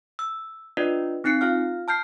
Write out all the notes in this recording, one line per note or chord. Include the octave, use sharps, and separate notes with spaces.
E6
D4 F4 B4 D5 D#5
C4 D#4 F#6 C7 C#7
F4 F5 F6
A5 F6 G6 C7